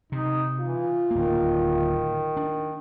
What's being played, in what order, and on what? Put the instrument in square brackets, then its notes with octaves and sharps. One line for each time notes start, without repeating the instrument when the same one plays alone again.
[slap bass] C3 [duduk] D#4
[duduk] E3 [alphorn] F4
[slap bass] D1 A#3 [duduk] D#3
[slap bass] D4